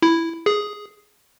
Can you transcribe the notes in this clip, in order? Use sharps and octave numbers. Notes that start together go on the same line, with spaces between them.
E4
G#4